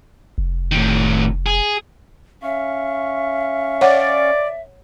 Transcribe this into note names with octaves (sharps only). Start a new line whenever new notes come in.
F1
A2 D#3
G#4
C#4 E5 F5 C#6
C#5 D5 F#5